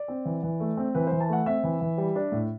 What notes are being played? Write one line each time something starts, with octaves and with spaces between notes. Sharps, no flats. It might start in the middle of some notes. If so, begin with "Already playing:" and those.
Already playing: D5
C4
E3
E3
A3
C4
E3 B4
C5
E3
A5
A3 F#5
C4 E5
E3
E3
G3
D4
A2